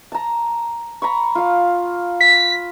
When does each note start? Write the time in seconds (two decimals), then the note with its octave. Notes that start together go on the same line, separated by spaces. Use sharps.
0.12 A5 A#5
1.02 A#5 B5 C#6
1.35 F4 F5
2.21 B6